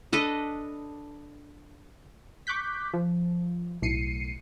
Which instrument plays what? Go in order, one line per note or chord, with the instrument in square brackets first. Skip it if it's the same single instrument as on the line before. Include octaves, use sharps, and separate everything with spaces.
[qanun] D4 A4 B4 D#5
[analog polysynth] C#6 D6 F#6 G6 B6
F3
B1 A2 C7 C#7 D#7